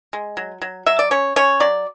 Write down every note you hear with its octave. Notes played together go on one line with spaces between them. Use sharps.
G#3
F#3
F#3
F#3 E5
D5
C#4 C#5
C#4 C#5
F#3 D5